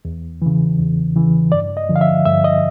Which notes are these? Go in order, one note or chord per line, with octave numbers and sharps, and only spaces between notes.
E2
C#3 E3
E2
C#3 E3
G2 D5
D#5
D3 F3
F5
E5
G2 E5
D#5